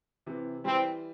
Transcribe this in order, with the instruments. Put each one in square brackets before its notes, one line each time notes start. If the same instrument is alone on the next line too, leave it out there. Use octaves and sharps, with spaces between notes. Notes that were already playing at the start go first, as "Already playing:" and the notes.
[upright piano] C3 E3
[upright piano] E3 G3 [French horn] C4